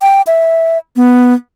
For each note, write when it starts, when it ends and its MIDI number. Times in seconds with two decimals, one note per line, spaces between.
0.02 0.22 79
0.27 0.78 76
0.96 1.34 59